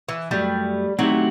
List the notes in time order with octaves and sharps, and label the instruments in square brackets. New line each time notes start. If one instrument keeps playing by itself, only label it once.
[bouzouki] E3
[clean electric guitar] F#2 F#3 A3 [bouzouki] G3
[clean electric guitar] D#3 A3 C4 E4 G4 [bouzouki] F#3